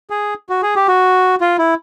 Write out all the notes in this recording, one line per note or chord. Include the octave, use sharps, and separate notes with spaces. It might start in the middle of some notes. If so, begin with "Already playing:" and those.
G#4
F#4
G#4
G4
F#4
F4
E4